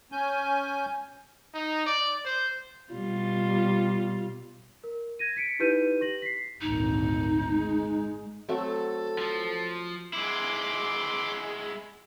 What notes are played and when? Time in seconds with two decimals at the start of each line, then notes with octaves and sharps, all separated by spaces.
0.12 C#4 G#5 G6
1.53 D#4
1.86 D5
2.24 C5
2.93 B2 G3 F4
4.84 A#4
5.19 G#6 A#6 D#7
5.36 B6 C#7 D7
5.59 D#4 E4 G4 B4 G6 D#7
6.01 G4 A#6 F#7
6.22 B6 C7
6.61 G#1 D2 A#2 D#4
7.53 G#3
8.49 F#3 A3 C4 A4
9.18 F3
10.13 G#3 E4 C6 D6